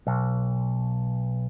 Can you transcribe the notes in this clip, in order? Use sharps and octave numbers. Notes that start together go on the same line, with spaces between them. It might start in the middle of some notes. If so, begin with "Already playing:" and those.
B1